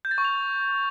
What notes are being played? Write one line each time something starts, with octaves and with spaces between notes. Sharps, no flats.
G6
A6
C#6
F7